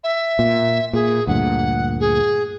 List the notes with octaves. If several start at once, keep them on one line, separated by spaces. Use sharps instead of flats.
E5
A#2
A#2 G#4
D2 G2 A#2 F#5
G#4